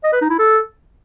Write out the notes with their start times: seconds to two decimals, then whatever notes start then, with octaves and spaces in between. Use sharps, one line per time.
0.04 D#5
0.13 B4
0.22 D#4
0.30 E4
0.39 A4